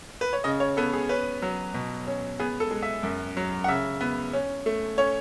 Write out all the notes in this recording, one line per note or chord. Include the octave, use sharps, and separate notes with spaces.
B4
C#5
C#3 D#5
C#5
B3 A4
G#4
C#4 B4
F#3
B2
C#4
B3 G#4
A4
G#3
E5
F#2
F#3
F#5
C#3 E5
B3
C#4
A3
C#4 C#5